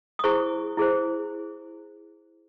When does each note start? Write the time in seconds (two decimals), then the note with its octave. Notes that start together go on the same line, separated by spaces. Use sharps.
0.19 D#6
0.24 E4 G#4 C5 C#6
0.77 E4 G#4 C5